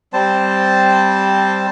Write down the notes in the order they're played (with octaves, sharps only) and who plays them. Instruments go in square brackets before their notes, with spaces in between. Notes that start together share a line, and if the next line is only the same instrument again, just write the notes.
[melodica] G3 C4 C5 A5